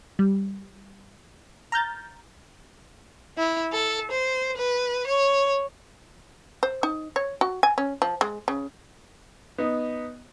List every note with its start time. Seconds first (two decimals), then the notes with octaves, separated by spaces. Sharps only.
0.19 G3
1.72 A#5 F6 G6 A6
3.38 E4
3.73 A4
4.11 C5
4.58 B4
5.08 C#5
6.63 C5
6.83 D#4
7.16 C#5
7.41 F#4
7.63 G#5
7.78 C#4
8.02 F3
8.21 G#3
8.48 C#3
9.58 B3 D#4